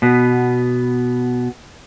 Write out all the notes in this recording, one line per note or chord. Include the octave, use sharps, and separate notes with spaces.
B2 B3